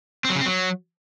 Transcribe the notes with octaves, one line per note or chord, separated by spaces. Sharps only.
C4
F#3
C#3
C4
F#3